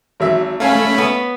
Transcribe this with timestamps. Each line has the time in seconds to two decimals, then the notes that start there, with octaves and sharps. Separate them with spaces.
0.20 G#1 F#3 E5
0.60 A3 C#4 C#5 F5 G#5 B5
0.98 B3